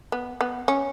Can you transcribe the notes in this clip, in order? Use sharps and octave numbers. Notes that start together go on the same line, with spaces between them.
B3
B3
C#4